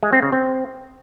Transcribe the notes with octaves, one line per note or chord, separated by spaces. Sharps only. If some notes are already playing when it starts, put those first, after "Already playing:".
G#3
C4
C#3
C4